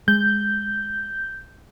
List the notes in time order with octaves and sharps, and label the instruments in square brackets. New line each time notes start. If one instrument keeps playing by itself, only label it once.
[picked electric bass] G#3 [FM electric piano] G6